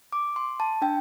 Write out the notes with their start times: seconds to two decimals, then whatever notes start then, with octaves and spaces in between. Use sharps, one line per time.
0.12 D6
0.36 C6
0.60 A5
0.82 D4 G5